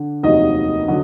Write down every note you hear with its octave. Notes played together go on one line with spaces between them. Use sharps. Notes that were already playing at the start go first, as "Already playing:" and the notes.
Already playing: D3
F1 D#2 D#3 F#3 D#5
D3 F#3